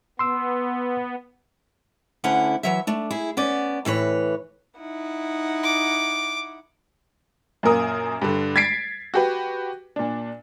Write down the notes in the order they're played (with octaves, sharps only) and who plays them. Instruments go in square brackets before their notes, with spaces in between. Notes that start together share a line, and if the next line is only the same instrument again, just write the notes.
[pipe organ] B3 [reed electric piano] C6 E6
[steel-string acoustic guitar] D2 D3 C#4 E4 F#5
E3 F#3 E5
A3 D4
E4 G#4
B3 C#4 D5
A2 E3 B4 C#5
[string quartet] D#4 E4 F#5
[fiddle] D6
[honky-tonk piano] F#2 A#2 A#3 A#4 D#6
G2 D3
G#6 A6 B6 C7 D7
F#4 G4 B4
A#2 D4